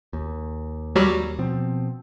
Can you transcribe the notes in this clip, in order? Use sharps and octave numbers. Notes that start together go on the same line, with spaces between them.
D#2
F#3 G3
B2 F3 C4